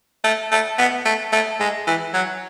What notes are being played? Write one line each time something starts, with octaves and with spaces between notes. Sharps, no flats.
A3
A3
B3
A3
A3
G#3
E3
F#3